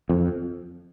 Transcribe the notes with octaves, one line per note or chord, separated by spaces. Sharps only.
F2